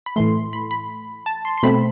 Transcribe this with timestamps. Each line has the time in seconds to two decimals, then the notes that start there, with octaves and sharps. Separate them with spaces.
0.06 B5
0.16 A2 E3 A3 C6
0.53 B5
0.71 B5
1.26 A5
1.45 C6
1.58 C6
1.63 B2 A3 C4 B5